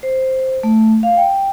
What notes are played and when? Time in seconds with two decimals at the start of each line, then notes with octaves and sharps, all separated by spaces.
0.03 C5
0.63 A3
1.03 F5
1.17 G5